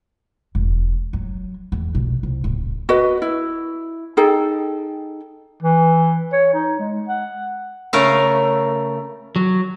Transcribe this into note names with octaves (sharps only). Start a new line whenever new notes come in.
E1
F#3
E2
B1
C2
D1
F#4 B4 D#5
E4
D#4 G#4 A4 G5
E3
C#5
D#4
G#3
F#5
C#3 A3 A#4 F5
F#3